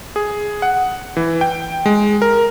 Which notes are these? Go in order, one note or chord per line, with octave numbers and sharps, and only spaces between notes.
G#4
F#5
E3
G5
G#3
A#4